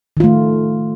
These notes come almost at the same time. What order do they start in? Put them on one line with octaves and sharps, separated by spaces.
D#3 F4 A3